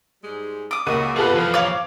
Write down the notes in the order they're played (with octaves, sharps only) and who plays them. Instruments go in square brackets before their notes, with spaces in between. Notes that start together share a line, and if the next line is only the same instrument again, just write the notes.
[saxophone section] G#2 G3 G#3
[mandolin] D6 D#6
[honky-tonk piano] C#2 A#3 D#7 [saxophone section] C#4 F#4
[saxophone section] C3 B3 [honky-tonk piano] F4 A4 B4 [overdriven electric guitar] G#4 F#5
[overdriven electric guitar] F2 E3 [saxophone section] F3
[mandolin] C#5 F5 [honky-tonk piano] D6